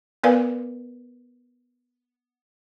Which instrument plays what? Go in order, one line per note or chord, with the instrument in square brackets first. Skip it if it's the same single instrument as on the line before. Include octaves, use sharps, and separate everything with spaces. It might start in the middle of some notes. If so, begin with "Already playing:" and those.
[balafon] B3 A#4 B4 D5 F5 G#5